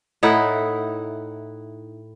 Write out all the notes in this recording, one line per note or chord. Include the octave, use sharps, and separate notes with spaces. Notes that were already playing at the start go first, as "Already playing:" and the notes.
A2 D#4 E4 F#5